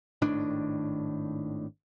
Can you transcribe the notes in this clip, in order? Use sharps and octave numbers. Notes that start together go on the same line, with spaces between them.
G#1 A2 D#3 D4